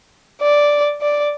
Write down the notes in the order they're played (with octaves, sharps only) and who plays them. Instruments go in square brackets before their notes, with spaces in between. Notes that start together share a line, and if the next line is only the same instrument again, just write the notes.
[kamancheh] D5
D5